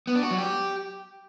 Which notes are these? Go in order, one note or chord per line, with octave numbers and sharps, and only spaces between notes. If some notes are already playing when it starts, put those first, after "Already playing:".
B3
D4
F#4
F#3
G4